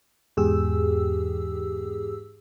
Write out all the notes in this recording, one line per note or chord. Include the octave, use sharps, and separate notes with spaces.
E2 G#2 G4 G#4 E6